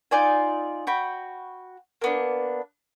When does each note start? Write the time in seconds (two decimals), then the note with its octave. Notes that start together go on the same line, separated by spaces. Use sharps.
0.11 D#4 F4 D5 G#5
0.87 F#4 G5 B5
2.01 A#3 B3 D4